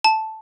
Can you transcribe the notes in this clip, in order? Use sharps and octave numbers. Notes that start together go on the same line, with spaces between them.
A5